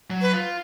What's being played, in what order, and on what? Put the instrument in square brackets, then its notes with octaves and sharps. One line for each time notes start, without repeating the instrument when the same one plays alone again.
[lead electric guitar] F#3
[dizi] B4
[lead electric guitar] F4